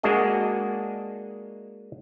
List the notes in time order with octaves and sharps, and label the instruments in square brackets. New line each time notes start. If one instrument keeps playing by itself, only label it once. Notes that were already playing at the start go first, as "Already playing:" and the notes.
[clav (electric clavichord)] G#3 A#3 D4 F#4 G#4 D#5